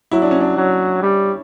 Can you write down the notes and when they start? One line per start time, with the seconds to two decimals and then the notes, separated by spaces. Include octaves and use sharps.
0.11 F#3 E4
0.22 D4
0.31 C#4
0.41 D4
0.57 F#3
1.02 G3